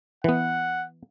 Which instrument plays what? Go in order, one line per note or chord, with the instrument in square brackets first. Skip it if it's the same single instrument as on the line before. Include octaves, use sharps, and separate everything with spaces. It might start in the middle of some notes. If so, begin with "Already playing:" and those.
[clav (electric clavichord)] E3 B3 [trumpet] F#5